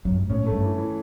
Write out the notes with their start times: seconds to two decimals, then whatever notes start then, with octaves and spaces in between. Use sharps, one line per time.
0.05 F#2
0.14 G2
0.21 G#2
0.30 A2 C#4
0.41 A2
0.46 A3
0.52 G2
0.62 E3
0.78 E3